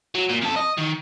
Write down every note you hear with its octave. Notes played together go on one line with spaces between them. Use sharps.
F#3
A#2
F2 A4
D#5
D#3